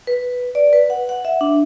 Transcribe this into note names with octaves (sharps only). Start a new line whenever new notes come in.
B4
D5
B4
F#5
F#5
E5
D4